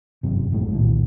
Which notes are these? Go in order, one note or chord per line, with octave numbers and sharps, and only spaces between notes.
G1 F#2 C3
A1 F2 A2 G#3
C2 A#2 D#3 A3